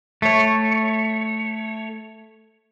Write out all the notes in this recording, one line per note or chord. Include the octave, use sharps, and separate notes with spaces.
A3 C#5